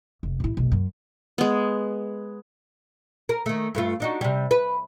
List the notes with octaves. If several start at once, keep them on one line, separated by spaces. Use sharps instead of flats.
F1
A1 E4
F#1 B1
F#2
G#3 B3
A#4
D#3 A3
G2 A3 F4
D4 D#4 F#4
C3 G3
B4